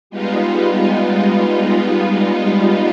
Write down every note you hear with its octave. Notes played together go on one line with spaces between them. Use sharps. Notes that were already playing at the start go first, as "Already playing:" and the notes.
G3 G#3 B3 D#4 F4